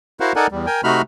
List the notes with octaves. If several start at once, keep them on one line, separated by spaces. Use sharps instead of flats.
E4 F#4 A#4 C5 F5 F#5
D#4 A4 A#4 D5 F#5 G#5
E2 G3
A#4 G5 G#5
C3 A3 D#4 F#4 B5 F6